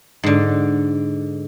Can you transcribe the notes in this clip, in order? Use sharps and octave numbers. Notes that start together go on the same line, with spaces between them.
G#2 D3